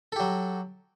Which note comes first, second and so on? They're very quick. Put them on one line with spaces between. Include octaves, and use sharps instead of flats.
A4 G4 F#3